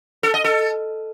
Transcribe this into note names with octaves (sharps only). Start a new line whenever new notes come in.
A4
D#5
A4